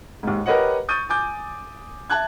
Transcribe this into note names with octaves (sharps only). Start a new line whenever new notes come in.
D#2 G#2
G4 A#4 B4 C#5 D#5 F#5
C#6 D#6 G6 A6 D#7
G#5 D6 G6
E5 A5 F#6 G#6